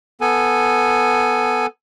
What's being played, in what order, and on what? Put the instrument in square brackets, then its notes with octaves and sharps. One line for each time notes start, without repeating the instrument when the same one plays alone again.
[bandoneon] B3 A4 G#5